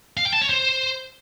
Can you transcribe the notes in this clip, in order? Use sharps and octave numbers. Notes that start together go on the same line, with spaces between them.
F5
G5
A5
C#5
C5